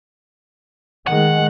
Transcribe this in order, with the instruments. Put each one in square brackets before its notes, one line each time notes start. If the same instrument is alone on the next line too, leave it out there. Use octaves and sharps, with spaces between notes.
[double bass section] D#3 G#3 [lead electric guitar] F#5